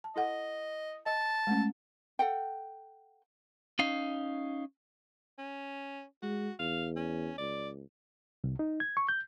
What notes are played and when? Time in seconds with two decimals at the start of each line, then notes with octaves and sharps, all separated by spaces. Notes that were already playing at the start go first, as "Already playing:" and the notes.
0.04 A5
0.16 E4 A4 D#5 F#5
1.06 D#5 A5
1.47 G#3 A3 C#4
2.19 A4 F#5 G5
3.79 C#4 D#4 F5
5.38 C#4
6.22 G#3 F#4
6.59 E2 F5
6.96 C#4
7.38 C#2 D5
8.44 C2
8.59 D#4
8.80 G#6
8.97 C#6
9.09 G6